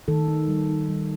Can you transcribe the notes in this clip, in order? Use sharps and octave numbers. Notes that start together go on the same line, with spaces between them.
D#3 A4
D#4
G3
D#4
G3